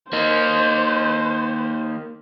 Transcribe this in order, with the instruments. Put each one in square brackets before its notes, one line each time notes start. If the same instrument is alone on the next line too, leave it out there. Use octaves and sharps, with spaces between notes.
[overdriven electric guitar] A#3 D#4 [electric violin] C5